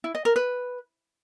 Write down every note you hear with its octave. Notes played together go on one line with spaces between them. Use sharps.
E4
D#5
A#4
B4